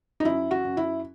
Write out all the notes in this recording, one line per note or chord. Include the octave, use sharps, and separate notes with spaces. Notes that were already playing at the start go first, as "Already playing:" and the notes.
D#4
F#2 E4
F#4
F#2
E4